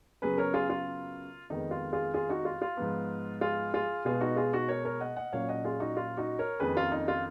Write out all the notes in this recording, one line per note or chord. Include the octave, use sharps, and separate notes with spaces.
F#2 C#3 F#3 B3 G#4 B4
A#4 C#5
F4 G#4
F4
F2 D#3 G#3 B3 D#4
F4
F4 G#4
F4 G#4
D#4 F#4
F4
F4
G#2 F3 B3
F4 G#4
F4 G#4
B2 G#3 B3 F4 G#4
D#4 F#4
F4 G#4
D#4 F#4
A#4 C#5
A#4 C#5
D#5 F#5
D#5 F#5
A#2 F#3 A#3 C#4 C#5 F5
D#5 F#5
F4 G#4
D#4 F#4
F4
D#4 F#4
A#4 C#5
F2 D#3 A#3 C#4 G#4 B4
F4
D#4
F4